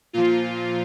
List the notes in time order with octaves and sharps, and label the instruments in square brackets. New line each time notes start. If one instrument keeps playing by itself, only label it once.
[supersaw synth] A#2 F3 F4